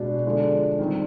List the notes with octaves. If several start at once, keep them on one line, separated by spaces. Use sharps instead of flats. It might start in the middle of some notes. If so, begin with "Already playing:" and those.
Already playing: B2 G#3 D4
D3 F3 G#3 D4
D#3 G3 C4 D#4